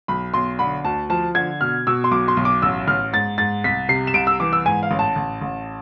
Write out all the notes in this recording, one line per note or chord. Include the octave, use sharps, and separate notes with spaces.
B1 B5
B1 C6
D3 B5
D2 A5
F3 A5
D3 G#6
B2 F6
B2 E6
C6
B1 D6
C6
B1
D6
A1 E6
A1 F6
G#2 A6
G#2 A6
C2 B6
C3 C7
E7
C2 D7
E6
E3 D6
E6
G#2 G#5
F5
A1
A5
A1
A1